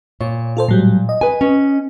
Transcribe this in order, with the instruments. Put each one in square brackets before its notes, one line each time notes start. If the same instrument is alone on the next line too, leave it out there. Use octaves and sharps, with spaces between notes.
[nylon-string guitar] A#2 [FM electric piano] C#5
[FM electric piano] F4 A4 C5
A2 F#3 G3
D#5
[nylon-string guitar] B4 G#5
C#4